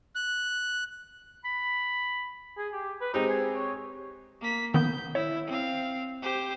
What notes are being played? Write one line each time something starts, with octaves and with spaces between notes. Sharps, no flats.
F#6
B5
G#4
G4
B4
G#3 C4 D#4 G4
G#4
C#5
A#3 B6
D#3 A#3 B3 G6
E4 C#5
C4 F5
G4 C5